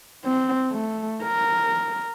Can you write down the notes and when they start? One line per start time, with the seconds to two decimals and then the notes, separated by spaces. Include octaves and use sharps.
0.25 C4
0.71 A3
1.23 A#4